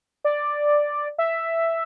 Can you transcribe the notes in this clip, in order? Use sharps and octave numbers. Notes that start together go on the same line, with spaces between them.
D5
E5